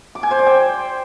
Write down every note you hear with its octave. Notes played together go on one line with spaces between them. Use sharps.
D6
G#5
C5
D5
G5